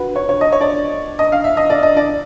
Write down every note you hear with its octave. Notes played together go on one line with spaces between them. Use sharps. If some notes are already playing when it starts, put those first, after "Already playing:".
Already playing: F#4 B4
C#5
C#5
D#5
C#5
D5
D#5
F5
E5
D#5
D5
D#5
D5